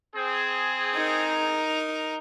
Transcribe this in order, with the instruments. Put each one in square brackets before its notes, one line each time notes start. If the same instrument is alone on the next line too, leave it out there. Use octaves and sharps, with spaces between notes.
[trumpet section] C4 G#4
[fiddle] D#4 A#4